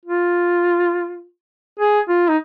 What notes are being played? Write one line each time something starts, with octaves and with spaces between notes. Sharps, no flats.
F4
G#4
F4
D#4